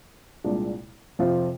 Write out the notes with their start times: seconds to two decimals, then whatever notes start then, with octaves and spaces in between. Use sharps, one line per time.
0.44 C2 A#2 G#3 D4 F4
1.19 F2 C3 F3 C4 F4